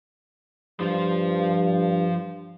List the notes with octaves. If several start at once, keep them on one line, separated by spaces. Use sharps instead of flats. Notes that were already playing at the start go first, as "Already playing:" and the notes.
G2 F3 C5